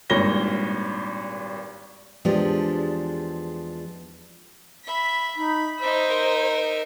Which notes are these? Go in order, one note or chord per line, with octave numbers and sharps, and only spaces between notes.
G#1 G2 A#2 C#5 A#6 G7
E2 F3 G#3 D4 G4
E5 B5
D#4 B5
D#4 C5 E5
A#4